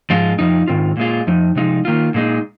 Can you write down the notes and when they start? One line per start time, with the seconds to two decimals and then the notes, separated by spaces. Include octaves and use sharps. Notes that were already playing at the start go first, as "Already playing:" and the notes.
0.10 G#2 F3 G#3 F4
0.39 F2 F3 D#4
0.68 G#2 D#3 C4 F4
0.97 A#2 G#3 F4
1.27 F2 F3 D#4
1.56 C3 F3 G#3 D#4
1.85 D#3 A#3 F4
2.14 A#2 G#3 D#4